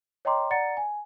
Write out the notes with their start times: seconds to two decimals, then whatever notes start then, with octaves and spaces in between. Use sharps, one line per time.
0.25 C#5 D#5 G5 A#5 C6 D6
0.51 D5 F#5 A#5 A6 C#7
0.77 G#5